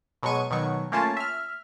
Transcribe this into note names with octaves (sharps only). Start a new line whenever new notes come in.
B2 F#3 G#3 C#6 D#7
B2 D#3 F#3 C#6
A3 A#3 C#4 F4 A5
E5 F6